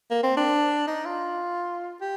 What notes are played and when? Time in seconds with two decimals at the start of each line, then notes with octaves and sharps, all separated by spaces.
0.11 A#3
0.23 C4
0.37 D4
0.87 D#4
1.06 F4
2.01 G4